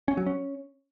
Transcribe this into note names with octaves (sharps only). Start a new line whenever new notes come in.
C#4
F#3
C#4